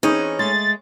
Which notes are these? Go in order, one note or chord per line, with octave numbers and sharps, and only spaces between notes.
E3 C4 C#4 D#4 G#4 B4
G#3 A3 A6